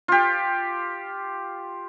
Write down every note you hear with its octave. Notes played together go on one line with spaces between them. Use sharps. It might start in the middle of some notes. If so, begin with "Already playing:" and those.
F4 G4